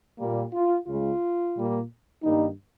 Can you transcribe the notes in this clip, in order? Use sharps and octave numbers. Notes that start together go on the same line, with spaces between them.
A#2 G3 A#3
F4
C#2 C#3 G#3 F4
A#2 G3 A#3
G2 D#3 G3 A#3 D#4